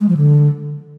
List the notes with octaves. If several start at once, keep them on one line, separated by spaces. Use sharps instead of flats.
G#3
F3
D3